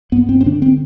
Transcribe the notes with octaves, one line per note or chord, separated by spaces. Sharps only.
G2 B3
C4
C4
D3 D4
C4